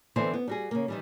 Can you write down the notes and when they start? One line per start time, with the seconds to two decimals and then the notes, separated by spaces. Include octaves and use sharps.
0.16 D3 E3 B3 C4 E4 C5
0.33 B3
0.48 G3 F#4 G#4
0.71 C#3 A#3
0.88 D#3 E3 G3